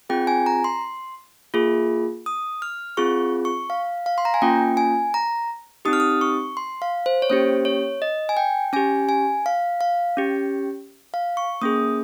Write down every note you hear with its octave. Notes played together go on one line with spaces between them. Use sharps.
C4 F4 G#4 G5
G#5
A#5
C6
A#3 F4 G#4
D#6
F6
C4 F4 G#4 C#6
C#6
F5
F5
C6
A#5
G#5
A#3 C#4 F4 G5
G#5
A#5
C4 D#4 G4 D#6
F6
D#6
C#6
C6
F5
C5
C#5
A#3 C#4 G4 C5
C#5
D#5
G#5
G5
C#4 G4 G#5
G#5
F5
F5
C#4 G4
F5
C#6
A#3 C#4 G#4 D#6